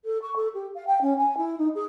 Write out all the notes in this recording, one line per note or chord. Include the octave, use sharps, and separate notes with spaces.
A4
C#6
A4
G4
F5
G5
C#4
G#5
E4
D#4
G#4